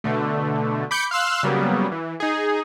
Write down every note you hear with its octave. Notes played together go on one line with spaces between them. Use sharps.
B2 D3 A3
B5 D6 G6 C#7
F5 C6 E6 F#6
C#3 F#3 G3 A#3 B3
E3
D#4 G#4